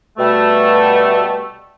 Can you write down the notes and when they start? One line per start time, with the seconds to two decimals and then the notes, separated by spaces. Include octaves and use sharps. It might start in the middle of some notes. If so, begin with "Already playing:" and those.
0.18 B2 G3 A3